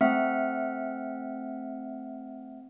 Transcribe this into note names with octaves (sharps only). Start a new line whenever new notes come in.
A3 C4 E5 F#5 F6